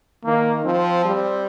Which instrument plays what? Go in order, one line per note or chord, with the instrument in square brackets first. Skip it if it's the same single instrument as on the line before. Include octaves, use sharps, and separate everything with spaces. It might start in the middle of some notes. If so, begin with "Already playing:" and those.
[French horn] D#3 [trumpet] A#3
[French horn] F3 [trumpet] C4
[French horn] G3